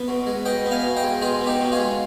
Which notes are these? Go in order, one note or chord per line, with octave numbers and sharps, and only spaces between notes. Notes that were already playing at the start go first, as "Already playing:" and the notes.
Already playing: B3
B2
G#3
B2 D#5 G5
B3
F5 G#5
B2
D#5 G5
G#3
B2 F4 G#4
B3
D#4 G4
B2
F4 G#4
G#3